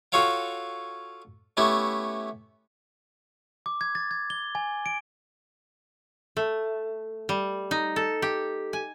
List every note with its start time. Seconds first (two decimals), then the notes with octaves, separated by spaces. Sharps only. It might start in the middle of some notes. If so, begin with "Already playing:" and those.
0.12 F4 F#4 A4 C#5 F5 G5
1.57 A3 B3 C#4 E4 G4
3.66 D6
3.81 G#6
3.95 A6
4.11 G#6
4.30 G7
4.55 G#5
4.86 D7
6.37 A3
7.29 G3
7.71 D#4
7.96 A4
8.22 G4
8.73 G#5